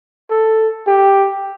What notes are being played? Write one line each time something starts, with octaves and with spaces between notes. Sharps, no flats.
A4
G4